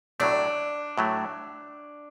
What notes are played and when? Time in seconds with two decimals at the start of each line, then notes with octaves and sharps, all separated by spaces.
0.20 A2 F#3 A3 D4
0.98 A2 F#3 A3